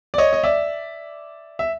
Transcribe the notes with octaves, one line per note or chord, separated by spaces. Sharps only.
D5
C#5 D#5
D#5
D5 E5
E5